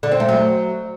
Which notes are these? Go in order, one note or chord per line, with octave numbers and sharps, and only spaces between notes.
D3
C4
A3
F#3